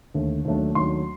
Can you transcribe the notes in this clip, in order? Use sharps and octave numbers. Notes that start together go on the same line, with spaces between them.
D#2 D3 A3
D#2 D#3 F#3 A3 D4
D#2 D#3 F#3 A3 D4 C6